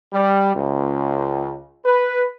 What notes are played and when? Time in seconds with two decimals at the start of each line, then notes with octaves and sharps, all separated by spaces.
0.13 G3
0.55 C#2
1.85 B4